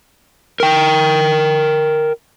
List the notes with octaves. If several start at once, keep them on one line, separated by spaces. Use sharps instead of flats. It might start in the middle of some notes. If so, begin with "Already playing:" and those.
A#4 G5